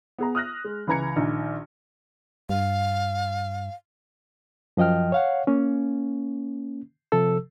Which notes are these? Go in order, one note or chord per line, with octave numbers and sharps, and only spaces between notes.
B3 G#4 A#5
D#6 F6 F#6 A#6
G#3
C#2 E3 B4 A#5 G#6 C#7
A#1 D#3
G2 F5
F#2 F3 D#5 G5 F6
C#5 F5 F#5
A#3 C#4
C3 F3 A4 E6